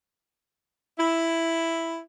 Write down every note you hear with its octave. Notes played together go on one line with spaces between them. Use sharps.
E4